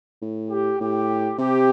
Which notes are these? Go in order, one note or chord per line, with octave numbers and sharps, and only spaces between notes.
A2
G4
A2 G4
C3 G4